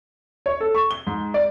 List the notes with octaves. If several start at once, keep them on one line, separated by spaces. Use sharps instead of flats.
C#5
A4
C#6
G7
G#2
D5